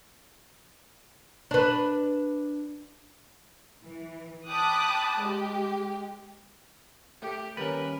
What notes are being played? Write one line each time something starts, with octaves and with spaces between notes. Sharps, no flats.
D4 B4
E3
G5 A5 B5 D6 D#6 F#6
G#3 G4
A3 G4
D#2 G3 C#4 A#4 B4